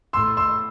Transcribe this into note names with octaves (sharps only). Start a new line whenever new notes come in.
A2 C6 E6
C6 E6